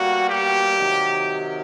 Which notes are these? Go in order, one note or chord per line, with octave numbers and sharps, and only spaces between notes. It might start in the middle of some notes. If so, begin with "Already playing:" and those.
Already playing: B2 G3 A#3 F#4
G4
C3 D#3 F#3